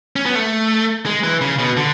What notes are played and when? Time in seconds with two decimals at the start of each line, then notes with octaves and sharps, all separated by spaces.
0.16 C#4
0.26 B3
0.35 A3
1.06 G#3
1.24 E3
1.41 C#3
1.59 B2
1.77 D3